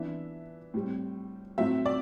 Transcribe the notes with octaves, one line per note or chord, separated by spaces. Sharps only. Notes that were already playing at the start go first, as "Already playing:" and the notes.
Already playing: E3 B3 D4 E5
A2 G3 C4
A2 F#3 C4 E5
D5